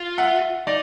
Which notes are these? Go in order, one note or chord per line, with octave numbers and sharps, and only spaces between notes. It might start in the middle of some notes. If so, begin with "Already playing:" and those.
Already playing: F4
E5 F#5
D#4 D5